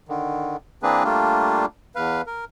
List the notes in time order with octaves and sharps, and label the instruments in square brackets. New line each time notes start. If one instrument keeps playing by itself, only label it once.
[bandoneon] D3 D#3
E3 A#3 C4 D4 G#4 B4
G3 A3 A#3 D4 F4
E2 B4 F5
A#4